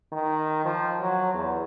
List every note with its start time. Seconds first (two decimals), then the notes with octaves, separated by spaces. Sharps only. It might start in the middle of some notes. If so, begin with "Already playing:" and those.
0.12 D#3
0.65 F3
1.00 F#3
1.34 E2